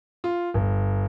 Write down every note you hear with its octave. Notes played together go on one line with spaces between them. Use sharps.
F4
G1